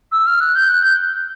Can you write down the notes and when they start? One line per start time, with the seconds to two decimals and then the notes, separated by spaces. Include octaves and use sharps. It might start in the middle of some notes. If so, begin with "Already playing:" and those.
0.12 E6
0.26 F6
0.41 F#6
0.55 G6
0.68 F#6
0.83 G6